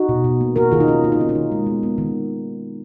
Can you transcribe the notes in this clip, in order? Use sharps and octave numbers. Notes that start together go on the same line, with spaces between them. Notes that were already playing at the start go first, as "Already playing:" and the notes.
Already playing: D#4 F#4
B2
B2
A#3
A#3 F#4 A#4
D#3 F4 G#4
D#4
D#3 C#4 F4
A#3 F4
D#4
D#3 C#4
D#4
D#3
G#3
B3
B3
D#3